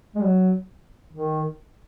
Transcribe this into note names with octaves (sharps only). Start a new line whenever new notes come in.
G#3
F#3
D#3